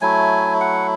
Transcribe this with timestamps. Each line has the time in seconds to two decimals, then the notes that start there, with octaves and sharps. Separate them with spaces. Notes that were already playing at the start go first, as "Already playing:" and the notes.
0.01 F#3 A3 E4 G#5
0.61 F#5